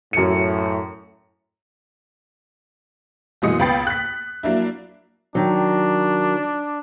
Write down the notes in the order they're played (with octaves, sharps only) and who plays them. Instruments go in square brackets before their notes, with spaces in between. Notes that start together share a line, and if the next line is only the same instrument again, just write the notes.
[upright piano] F#2 C#7 [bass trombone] A2
[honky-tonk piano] F#1 B2 E3 G#3 D#6 C#7
C#2 B3 G5 B5 A6 C7
F#6 B6
F#3 A#3 D4 E4
[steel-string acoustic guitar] D#3 F#3 [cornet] D4